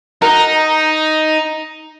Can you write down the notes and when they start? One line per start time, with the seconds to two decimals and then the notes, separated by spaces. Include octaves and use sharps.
0.22 D#4 F#4 A#4